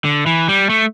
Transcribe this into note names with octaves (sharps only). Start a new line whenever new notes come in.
D3
E3
G3
A3